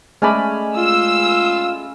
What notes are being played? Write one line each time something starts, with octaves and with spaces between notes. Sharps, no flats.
G#3 A3 C#4 D5 G#5 B5
F4 E6